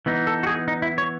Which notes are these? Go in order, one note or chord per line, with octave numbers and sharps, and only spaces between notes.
E3 B3 D#4
A4
F#4
G#4
D#4
E4
C#5